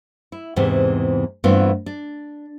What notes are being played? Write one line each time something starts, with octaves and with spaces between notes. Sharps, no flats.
E4
E2 G#2 C3 E3 C4
G2 E3 A3 B3 C4 F4
D4